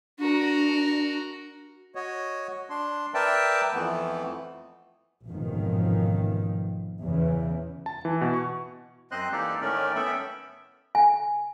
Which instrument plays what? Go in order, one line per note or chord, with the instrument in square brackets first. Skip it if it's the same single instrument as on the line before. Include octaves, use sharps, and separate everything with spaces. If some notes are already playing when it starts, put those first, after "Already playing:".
[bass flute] D4 [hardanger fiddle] F#4 A#4
[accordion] F#4 C#5 D#5
D4 C6
A#4 B4 D5 E5 G5 A5
F2 E3 A3 B3
[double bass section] A1 F2 G#2 B2 D#3 F3
E2 C#3 E3
[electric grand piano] A5
E3
B2
C#6
[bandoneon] F#2 C4 C5 D#5 C6 F#6
E3 A#3 D#4 G4 A4 D5
A2 D#3 A3 C#4 A#4 D5
B3 C#4 A4 E5 G5 B5
[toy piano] G#5